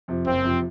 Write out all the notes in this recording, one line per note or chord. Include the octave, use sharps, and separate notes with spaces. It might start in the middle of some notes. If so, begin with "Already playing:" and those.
F2 C3 F3
F#1 C4
F2 C3 F3